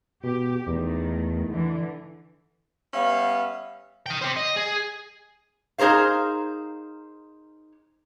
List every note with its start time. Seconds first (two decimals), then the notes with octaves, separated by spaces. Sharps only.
0.23 B2 G4
0.67 E2 D#3 A3
1.50 D3 E3
2.93 G3 B3 C#4 E5 F5
4.06 D#5 G5
4.21 G4 C5
4.36 D#5
4.56 G#4
5.78 D#4 G#4 A#4 C5 F5